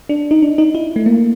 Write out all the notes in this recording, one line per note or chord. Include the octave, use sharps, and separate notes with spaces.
D4
D#4
D4
D#4
E4
A3
A#3